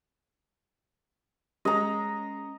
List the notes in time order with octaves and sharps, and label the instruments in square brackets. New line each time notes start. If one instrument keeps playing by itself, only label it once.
[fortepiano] G#3 [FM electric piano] C#4 [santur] D#5 A#5